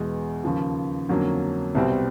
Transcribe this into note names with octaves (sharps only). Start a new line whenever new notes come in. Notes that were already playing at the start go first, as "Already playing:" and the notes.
Already playing: E2 B2 G#3
D#2 C#3 F3
F2 D3 F#3 A#3 C#4
C2 B2 G3 C4